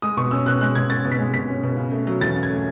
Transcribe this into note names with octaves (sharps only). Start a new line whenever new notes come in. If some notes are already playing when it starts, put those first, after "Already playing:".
G#3 D#6
B2 C#6
C#4 E6
B2 F#6
G#3 F#6
B2 G#6
C#4 A6
B2
B6
G#3
B2 B6
C#4
B2
C#3
A3
F#3
E2 A6
C#3
G#6
A3